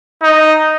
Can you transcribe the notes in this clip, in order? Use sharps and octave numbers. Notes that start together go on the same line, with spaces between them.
D#4